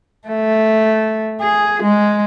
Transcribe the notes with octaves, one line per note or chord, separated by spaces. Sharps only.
A3
G#4
G#3